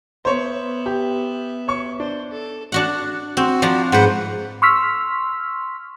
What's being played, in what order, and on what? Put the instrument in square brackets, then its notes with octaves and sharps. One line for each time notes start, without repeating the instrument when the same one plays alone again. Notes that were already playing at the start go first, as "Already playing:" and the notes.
[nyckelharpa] B3 E5 [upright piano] C5 C#5
[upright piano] G4
C#5 C#6
[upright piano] D4 [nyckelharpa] C5
[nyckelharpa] A4
[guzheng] D4 F#4 F#5
[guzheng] C4 [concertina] F#4
[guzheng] F3 D4 A#5
[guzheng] G#2 B4 [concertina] C5 F#5
[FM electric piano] C6 C#6 E6 F6 B6